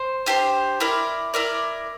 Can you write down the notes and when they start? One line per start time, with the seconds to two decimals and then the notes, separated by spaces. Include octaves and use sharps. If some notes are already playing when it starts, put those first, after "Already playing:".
Already playing: C5
0.26 D4 G4 C5
0.80 E4 A#4 D5
1.34 E4 A#4 D5